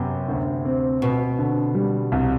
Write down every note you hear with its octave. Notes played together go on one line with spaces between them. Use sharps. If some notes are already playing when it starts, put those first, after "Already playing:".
Already playing: F#2 C3 B3
D2
C4
B2 C4
D3
G3
C2